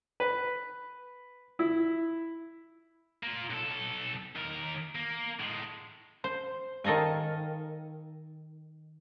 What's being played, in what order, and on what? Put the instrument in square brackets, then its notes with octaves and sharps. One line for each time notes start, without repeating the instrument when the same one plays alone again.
[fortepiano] B4
E4
[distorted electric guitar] A#3 F4
B1 A4
D#2 A#4
A#3
A2 G#3
[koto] C5
D#3 A4 D#5 F5 G#5